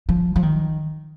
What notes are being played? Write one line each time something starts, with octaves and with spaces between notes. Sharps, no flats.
F3
F3
D#3